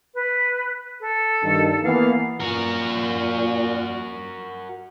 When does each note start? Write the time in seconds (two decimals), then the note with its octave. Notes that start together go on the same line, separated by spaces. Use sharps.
0.14 B4
1.00 A4
1.42 G2 D#3
1.83 E3 A#3 B3 F5
2.40 A#2 F#4 A#4